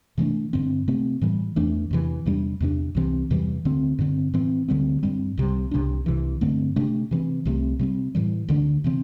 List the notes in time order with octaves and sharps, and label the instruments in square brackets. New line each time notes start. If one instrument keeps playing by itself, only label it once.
[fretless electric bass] C3 E3 A3 D4
G2 D3 C4
C3 A3 C4
A2 E3 G3
E2 E3 A3 D4
E2 C3 E3
E2 C3 G3 D4
E2 C3 A3 D4
C2 C3 E3 C4
E2 C3 E3 G3
D2 D3 C4
G2 D3 C4
A2 E3 C4
D2 D3 G3 C4
G2 G3 C4
C2 C3 G3
C2 C3 G3 D4
C2 C3 E3
G2 D3 A3 C4
C3 A3 D4
C3 E3 C4
C2 C3 A3 C4
C3 G3 C4
A2 E3 G3
D2 D3 A3 D4
C3 E3 C4